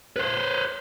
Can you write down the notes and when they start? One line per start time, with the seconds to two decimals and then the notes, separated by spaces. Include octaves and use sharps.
0.16 B4 C5